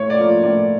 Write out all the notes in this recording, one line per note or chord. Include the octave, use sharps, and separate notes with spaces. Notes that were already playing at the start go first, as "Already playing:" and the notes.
Already playing: A2 C#5
D5
F3 A#3
A2 D5